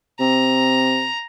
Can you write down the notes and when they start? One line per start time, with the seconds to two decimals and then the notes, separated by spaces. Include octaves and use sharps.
0.20 C3 A#5